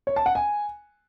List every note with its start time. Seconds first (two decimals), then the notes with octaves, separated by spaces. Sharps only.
0.07 C#5
0.16 A5
0.26 F#5
0.35 G#5